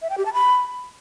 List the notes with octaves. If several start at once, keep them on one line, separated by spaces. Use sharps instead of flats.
E5
G5
G4
A5
B5